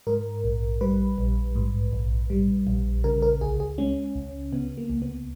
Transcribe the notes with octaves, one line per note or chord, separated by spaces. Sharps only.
G#2 A#4
A#1
G3 B4
A#1
G#2
A#1
G3
A#1
C#3 A#4
A#4
C#2 G#4
G#4
G#3 C#4
C#2
C#3 B3
A#3
C#2
B3